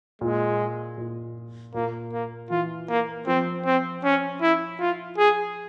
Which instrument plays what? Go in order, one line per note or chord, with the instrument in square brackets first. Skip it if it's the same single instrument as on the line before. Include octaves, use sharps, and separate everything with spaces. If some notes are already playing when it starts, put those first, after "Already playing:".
[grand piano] A#2 [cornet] G#3
[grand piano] A#2
[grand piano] A#2 [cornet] A#3
[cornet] A#3
[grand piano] E3 [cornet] F4
[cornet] A#3
[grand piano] F3 [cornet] C4
[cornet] C4
C#4
E4
F4
G#4